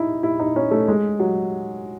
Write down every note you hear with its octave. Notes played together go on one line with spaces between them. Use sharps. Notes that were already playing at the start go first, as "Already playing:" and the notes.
Already playing: D#4 E4
E4
D#4
C#4
A3
G#3
F#3